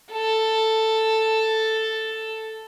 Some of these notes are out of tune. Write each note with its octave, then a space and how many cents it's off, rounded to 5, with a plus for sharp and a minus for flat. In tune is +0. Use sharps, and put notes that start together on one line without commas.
A4 +5